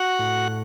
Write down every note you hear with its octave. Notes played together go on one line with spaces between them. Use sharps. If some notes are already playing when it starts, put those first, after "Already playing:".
Already playing: F#4 F#5
A2